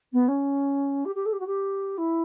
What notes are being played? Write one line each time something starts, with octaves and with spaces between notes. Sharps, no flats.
B3
C#4
G4
G4
A4
G4
F#4
G4
E4